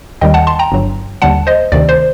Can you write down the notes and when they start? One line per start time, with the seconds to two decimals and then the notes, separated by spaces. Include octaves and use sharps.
0.21 D#2 D#3 G3 D#5 G5
0.34 F#5 A5
0.47 A5 C6
0.59 G5 A#5
0.72 G1 G2 F#3
1.22 D#2 D3 G3 F#5 A5
1.47 C5 D#5
1.72 D2 C3 D#3 D5
1.89 C5